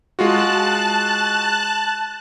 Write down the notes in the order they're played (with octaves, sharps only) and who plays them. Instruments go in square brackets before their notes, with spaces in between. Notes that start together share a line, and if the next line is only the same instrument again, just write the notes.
[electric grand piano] G#3 F4 F#4 [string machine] A5 F#6